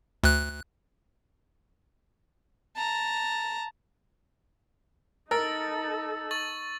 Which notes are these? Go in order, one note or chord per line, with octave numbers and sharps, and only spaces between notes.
D2 F#6
A5 A#5
D#4 A4 A#4 E6 A6
C#6 A6 F#7